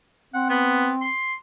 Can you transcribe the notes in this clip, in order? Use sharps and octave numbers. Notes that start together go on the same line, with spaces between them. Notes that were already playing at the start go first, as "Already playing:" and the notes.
C4 F#5
B3
C6